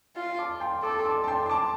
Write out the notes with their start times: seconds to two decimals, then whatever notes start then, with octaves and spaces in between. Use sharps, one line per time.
0.16 F4
0.39 A5 D6
0.60 G5 C6
0.83 A4 A5 D6
0.99 C6
1.05 A5 D6
1.24 A5
1.27 G5 C6
1.46 C6
1.50 A5 D6